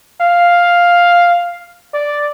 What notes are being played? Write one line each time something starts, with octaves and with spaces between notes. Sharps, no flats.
F5
D5